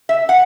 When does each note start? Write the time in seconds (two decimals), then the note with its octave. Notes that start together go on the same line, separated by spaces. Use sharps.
0.09 E5
0.29 F#5